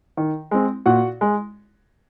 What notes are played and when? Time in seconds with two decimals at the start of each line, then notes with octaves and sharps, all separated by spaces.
0.17 D#3
0.51 G#3 C4
0.86 A#2 F#4 F#5
1.21 G#3